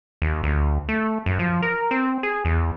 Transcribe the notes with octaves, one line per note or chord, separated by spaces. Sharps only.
D#2
D2
A3
F#2
F3
A#4
C4
G#4
E2